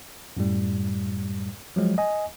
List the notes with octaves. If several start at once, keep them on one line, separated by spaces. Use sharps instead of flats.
F#2 A2 G3
F3 F#3 G#3
D#5 G#5